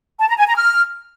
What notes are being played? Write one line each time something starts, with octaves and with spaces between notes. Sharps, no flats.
A5
A#5
G#5
A#5
F6